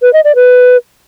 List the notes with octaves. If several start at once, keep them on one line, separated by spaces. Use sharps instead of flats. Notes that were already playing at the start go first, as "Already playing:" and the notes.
B4
D#5
D5
B4